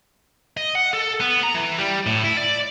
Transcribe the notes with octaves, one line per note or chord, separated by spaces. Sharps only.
D#5
F#5
A4
B3
A#5
E3
G3
A2
E4
D5